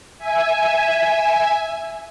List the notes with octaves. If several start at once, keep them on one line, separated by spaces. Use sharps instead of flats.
E5 G#5